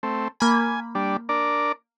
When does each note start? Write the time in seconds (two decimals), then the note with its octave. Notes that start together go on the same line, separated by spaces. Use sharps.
0.03 A3 C4
0.40 A#3 G#5 B5
0.95 G3 D4
1.29 D4 A#4 D5